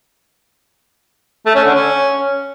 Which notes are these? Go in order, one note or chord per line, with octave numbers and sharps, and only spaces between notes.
A3
C#4
D3
C#4